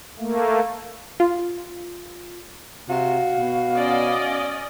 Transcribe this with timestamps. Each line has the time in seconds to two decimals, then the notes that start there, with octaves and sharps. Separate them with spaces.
0.19 A3 A#3
1.20 F4
2.89 C3 F#4 F5
3.37 B2
3.76 C#4 D5 D#5